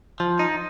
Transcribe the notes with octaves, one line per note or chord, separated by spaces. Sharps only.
F3
D#4